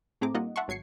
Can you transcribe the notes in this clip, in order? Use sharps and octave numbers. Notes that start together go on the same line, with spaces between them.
A2 A3 C4 G#4 A#5 D6
G3 A#3 D#4 F4 D#5 F#5
E5 F#5 A5 C6 C#6
G#1 F#3 G#6 C7 C#7